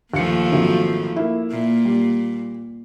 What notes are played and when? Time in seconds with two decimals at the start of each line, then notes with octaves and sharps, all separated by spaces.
0.14 D#2 A#2 F3 A3 C#7
0.52 G#1 D#3 F#3
1.16 A#3 E4
1.51 A#2
1.85 G3